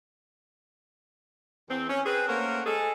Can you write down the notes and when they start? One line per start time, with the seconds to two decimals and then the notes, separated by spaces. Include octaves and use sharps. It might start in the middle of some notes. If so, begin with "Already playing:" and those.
1.69 E2 C4
1.89 C#4
2.06 C4 G#4 B4
2.28 A3 A#3 C#4 A#4 C5 F#5
2.65 G#3 G#4 A4